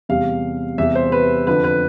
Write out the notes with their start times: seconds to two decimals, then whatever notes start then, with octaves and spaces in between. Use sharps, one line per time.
0.09 E2 C3 G3 F5
0.78 E2 C3 G3 E5
0.95 C5
1.12 B4
1.47 F2 D3 F3 B4
1.64 B4